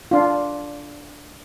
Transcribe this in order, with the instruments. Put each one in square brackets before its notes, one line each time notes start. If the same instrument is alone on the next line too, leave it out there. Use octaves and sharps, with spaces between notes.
[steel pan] D4 F4